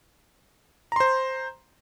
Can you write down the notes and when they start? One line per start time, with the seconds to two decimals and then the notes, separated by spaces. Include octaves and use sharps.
0.92 A#5
0.96 C6
1.00 C5